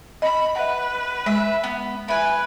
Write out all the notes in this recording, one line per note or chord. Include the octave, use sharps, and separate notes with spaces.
D#5 B5
B4 E5 F#5
G#3 E5
B3
E4 B4 G#5